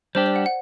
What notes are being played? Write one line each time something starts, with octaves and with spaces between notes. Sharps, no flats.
G3 D4 G4 C5
D5
F#5
F#5